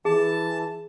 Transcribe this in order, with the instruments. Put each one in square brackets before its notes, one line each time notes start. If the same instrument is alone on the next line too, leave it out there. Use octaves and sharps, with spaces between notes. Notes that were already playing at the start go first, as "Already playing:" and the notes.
[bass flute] E3 [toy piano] G#4 [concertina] A5